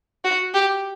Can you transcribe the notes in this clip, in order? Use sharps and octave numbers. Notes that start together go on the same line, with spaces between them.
F#4
G4